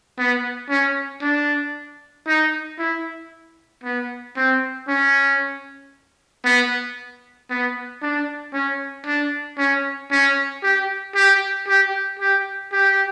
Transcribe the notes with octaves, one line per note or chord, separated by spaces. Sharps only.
B3
C#4
D4
D#4
E4
B3
C4
C#4
B3
B3
D4
C#4
D4
C#4
C#4
G4
G4
G4
G4
G4